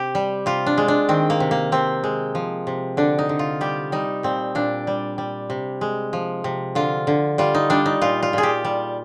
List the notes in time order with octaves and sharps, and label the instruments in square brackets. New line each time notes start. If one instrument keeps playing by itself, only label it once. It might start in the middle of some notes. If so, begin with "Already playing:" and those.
Already playing: [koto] C3 G4
G3
C3 F4
D4
G#3
D4
D#3 C4
A#3
C3
A#3
C3 C4
G#3
F3
C3
D3 D4
D#4
D3
F4
G3 G4
G3 D#4
A#2 C4
A#2 D4
G3
G3
C3
G#3
F3
C3
D3 F4
D3
G3 F4
D#4
G3 D4
D#4
A#2 F4
F4
A#2 G#4
G4
G3